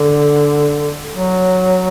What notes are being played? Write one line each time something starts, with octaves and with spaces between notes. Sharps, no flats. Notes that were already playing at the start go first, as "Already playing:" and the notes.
Already playing: D3
F#3